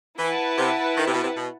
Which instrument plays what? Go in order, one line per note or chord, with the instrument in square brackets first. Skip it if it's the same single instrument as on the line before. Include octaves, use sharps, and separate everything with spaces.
[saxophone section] E3 [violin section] E4 B4 F#5 A5
[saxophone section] C3
D#3
C3
B2
C3
B2